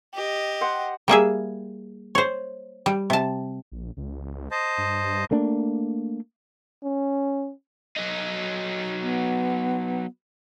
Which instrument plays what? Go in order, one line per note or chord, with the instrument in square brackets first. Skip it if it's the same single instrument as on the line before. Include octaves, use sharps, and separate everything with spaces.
[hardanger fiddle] G4 D#5
[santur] C5 F#5 G5
[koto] G3 A#3 G#4 E5
C5 C#5
G3
C3 A5
[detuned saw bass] A#1
C#2
[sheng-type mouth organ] C5 D#5 A5
[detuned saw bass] G2
[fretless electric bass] A3 A#3 D4
[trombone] C#4
[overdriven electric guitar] F#3 D#4
[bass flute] B3